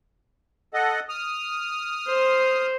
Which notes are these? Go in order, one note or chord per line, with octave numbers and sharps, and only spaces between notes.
A4 D#5 F#5
D#6 F6
C5